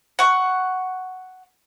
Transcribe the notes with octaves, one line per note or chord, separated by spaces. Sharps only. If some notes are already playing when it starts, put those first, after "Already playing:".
F#5 C#6